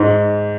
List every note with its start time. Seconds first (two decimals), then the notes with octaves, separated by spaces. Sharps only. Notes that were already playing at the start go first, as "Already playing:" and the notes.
Already playing: G#2